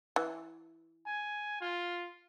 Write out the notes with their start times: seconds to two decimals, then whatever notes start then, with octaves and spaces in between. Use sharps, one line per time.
0.16 E3
1.07 G#5
1.61 F4